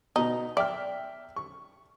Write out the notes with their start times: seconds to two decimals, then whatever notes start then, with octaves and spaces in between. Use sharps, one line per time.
0.16 B2 D#4 A#5
0.57 D5 E5 G5 F6
1.36 C#6